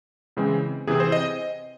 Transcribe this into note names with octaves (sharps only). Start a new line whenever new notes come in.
C#3 E3 G#3 C4
C3 E3 C4 G#4
C5
D#5